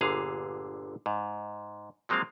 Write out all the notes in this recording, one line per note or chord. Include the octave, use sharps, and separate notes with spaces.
G1 A#2 D3 G#4 F5
G#2
F3 F#3 G#3 A#3 C4 F5